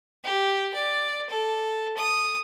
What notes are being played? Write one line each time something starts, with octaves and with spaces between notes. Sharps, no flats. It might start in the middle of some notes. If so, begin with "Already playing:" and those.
G4
D5
A4
D#6